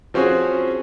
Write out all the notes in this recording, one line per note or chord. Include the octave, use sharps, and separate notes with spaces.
F3 C4 C#4 F#4 G#4